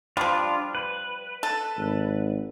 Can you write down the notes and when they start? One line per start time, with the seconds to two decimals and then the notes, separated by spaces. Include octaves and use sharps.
0.17 F3 G3 D4 F4
0.75 B4
1.43 A4
1.77 G#1